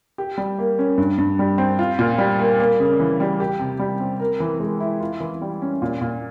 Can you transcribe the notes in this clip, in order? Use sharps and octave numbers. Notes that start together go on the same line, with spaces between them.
G4
G3
A#3
C#4
G2
G2
G3
C4
F4
A#2
G3
A#3
A#3
C#3
E3
G3
G4
C3
G3
C4
A#4
E3
G#3
E4
F4
E3
G3
C#4
A#2
A#2